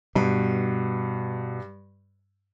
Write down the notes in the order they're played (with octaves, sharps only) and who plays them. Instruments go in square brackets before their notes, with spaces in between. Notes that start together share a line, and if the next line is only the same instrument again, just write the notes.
[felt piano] G2 [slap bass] B2